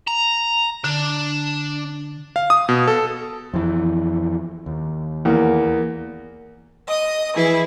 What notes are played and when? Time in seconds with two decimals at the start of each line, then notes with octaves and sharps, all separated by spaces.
0.08 A#5
0.84 D3 D4
2.36 F5
2.50 D#6
2.69 B2
2.87 A4
3.53 F2 E3
4.66 D#2
5.25 E2 A#3
6.88 D#5 D#6
7.35 E3 E4 G#4 B4